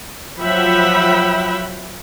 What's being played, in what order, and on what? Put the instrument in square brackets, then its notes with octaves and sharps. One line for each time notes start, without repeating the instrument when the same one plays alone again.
[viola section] F3 F#3 E5 F#5 G5 B5